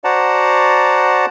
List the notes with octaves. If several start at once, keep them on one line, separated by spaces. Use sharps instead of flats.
F#4 C5 D5 F#5 A5 A#5